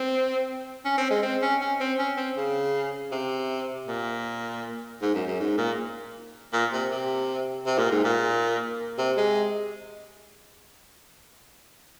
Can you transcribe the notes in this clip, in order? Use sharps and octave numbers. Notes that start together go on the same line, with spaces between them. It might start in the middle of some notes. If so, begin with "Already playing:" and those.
Already playing: C4
C#4
C4
G#3
C4
C#4
C#4
C4
C#4
C4
C#3
C3
A#2
G#2
F#2
F#2
G#2
A#2
A#2
C3
C3
C3
A#2
G#2
A#2
C3
G#3